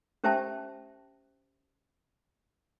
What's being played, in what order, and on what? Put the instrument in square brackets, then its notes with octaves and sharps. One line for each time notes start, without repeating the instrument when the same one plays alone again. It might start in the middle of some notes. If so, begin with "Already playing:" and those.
[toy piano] C#4 G4 C5 E5 G5 A5